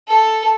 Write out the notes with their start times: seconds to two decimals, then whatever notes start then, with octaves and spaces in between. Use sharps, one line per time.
0.08 A4